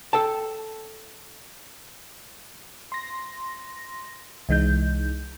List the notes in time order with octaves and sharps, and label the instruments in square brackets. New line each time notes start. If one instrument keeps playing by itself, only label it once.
[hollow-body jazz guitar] A4 G5 A5
[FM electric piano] C6 A#6
C2 E3 G#3 D#4 G6